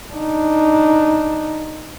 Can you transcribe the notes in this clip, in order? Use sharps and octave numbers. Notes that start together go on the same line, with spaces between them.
D4 D#4